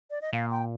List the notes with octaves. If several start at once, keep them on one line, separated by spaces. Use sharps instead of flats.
D5
D#5
A#2 F5
G5